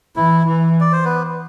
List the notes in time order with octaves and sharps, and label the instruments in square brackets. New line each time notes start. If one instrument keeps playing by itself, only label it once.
[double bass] E3 [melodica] E4
[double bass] E3
[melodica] D5
C5
B3 B4